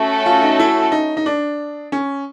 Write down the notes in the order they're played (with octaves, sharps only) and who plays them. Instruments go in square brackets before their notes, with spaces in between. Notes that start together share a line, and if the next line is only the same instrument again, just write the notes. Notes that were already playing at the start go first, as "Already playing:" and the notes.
Already playing: [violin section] A3 C#4 F#4 A4
[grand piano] F4
D#4
E4
D#4
D#4
D4
C#4